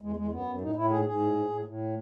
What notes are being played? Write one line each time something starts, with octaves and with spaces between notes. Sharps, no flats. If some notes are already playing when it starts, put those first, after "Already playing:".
E2 G#3
E2 G#3
F#2 B3
F#2
A2 D#4
A2 E4
G#2 G#4
G#2 G#4
A2
A2
A2
A2